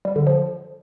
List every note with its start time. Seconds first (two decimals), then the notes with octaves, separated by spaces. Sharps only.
0.05 G3
0.16 D3
0.27 F3